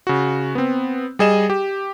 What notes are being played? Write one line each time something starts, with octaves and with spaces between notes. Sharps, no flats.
C#3 F#4
B3 C4
G3 G#4 D#5 E7
G4